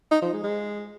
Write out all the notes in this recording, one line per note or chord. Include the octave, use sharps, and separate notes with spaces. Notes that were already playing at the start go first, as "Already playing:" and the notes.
D#4
F3
G#3
G#3